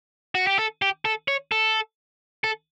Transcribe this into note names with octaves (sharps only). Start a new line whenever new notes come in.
F#4
G4
A4
G4
A4
C#5
A4
A4